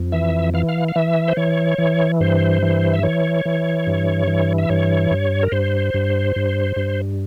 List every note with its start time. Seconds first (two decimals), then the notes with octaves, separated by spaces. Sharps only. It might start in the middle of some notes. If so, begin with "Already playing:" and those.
Already playing: F2
0.12 E3 E5
0.54 E3 F5
0.69 F5
0.88 F5
0.96 E3 E5
1.28 C5
1.37 E3 C#5
1.78 E3
2.20 G2 C5
2.63 E3
2.93 E5
3.03 E3 C#5
3.45 E3
3.87 G2
4.27 E3
4.58 E5
4.70 G2 C#5
5.11 G2
5.43 A#4
5.52 G2 C5
5.94 G2
6.36 G2
6.76 G2